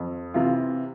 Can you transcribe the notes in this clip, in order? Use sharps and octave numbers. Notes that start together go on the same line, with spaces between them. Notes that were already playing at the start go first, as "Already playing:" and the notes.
Already playing: F2
C3 E3 F4